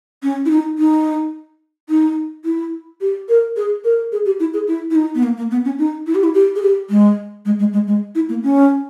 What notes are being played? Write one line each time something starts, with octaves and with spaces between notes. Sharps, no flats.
C#4
E4
D#4
D#4
D#4
E4
G4
A#4
G#4
A#4
G#4
G4
E4
G#4
E4
E4
D#4
B3
A#3
A#3
B3
C#4
D#4
E4
G4
E4
G4
G#4
G4
G#3
G#3
G#3
G#3
G#3
E4
A#3
C#4